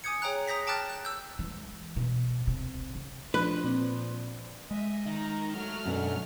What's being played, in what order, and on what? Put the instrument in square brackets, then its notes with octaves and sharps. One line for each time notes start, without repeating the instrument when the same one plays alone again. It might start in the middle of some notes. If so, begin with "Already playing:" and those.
[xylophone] G#5 D6 D#6 G6 G#6 C#7
G#4 C#5 G5 A#5 F#6
A#5 D#6 G6 A#6 B6
G5 A5 D6 F6 F#6 A6
F#6
E6 G6
[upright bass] E3 G#3
B2
C3
C#3
[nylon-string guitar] F3 [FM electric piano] D4 F#6 [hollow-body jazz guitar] B4
[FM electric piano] A#2 C4 D5
[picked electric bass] G#3 [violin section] D#5 E5
[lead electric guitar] D#3 [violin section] A#5
[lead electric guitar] F#3 [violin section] A3 F6
[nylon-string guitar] F#2 B2 D3